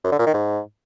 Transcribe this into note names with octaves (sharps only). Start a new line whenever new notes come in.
F#2
D3
A#2
D#3
G#2